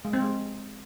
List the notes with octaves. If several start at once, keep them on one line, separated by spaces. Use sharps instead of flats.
G#3
C4
G#3